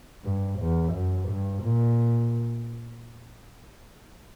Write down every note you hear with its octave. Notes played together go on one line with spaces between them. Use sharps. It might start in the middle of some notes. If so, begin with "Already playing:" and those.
G2
E2
F#2
G2
A#2